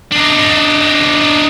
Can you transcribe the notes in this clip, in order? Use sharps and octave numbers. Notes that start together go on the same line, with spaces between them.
D4 D#4